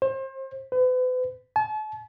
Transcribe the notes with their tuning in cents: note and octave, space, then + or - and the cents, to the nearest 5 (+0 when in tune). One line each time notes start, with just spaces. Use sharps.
C5 +35
B4 +40
A5 -40